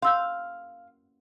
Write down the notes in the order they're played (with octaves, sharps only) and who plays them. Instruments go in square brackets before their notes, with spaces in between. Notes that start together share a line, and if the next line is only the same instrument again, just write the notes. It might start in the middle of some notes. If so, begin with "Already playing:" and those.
[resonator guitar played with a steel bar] F5 [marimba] C6 E6 G6